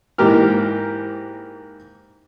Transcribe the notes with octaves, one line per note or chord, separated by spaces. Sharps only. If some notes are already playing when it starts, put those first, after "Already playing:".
G#2 E3 A#3 G4 A#4 F6